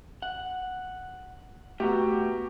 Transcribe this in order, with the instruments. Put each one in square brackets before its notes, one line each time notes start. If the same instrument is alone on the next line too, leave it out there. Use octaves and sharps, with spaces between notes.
[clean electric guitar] F#5
[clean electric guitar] A3 A#5 [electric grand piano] B3 F#4 G4